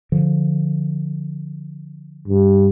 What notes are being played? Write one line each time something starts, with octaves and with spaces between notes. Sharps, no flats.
D3 F3
G2